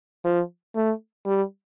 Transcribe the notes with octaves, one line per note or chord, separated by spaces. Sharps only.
F3
A3
G3